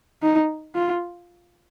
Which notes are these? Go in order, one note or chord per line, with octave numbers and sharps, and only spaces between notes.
D#4
F4